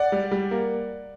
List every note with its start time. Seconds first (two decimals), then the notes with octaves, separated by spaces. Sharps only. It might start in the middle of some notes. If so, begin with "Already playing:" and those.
Already playing: D5 F#5
0.12 G3
0.31 G3
0.51 A#3